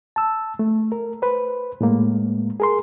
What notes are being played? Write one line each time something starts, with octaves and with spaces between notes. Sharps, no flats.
A5 E6
A3
A#4
B4 C5
A2 G#3 A#3
G#4 A#4 C6